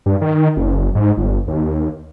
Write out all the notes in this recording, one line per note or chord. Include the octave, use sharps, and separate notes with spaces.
G2
D#3
F#1
G#2
G1
D#2